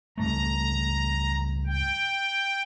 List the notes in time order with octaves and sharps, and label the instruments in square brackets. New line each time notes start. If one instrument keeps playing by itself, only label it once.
[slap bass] C#2 G2 A3 [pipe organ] A#5
[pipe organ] G5